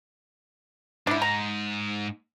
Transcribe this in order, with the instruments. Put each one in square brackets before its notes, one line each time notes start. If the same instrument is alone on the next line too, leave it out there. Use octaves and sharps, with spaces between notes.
[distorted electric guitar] G#2 [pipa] D4 E4
[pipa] A#5